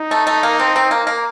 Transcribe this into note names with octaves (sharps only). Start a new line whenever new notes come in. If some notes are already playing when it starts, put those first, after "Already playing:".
Already playing: D#4
A3
A3
A#3
C4
C4
A#3
A#3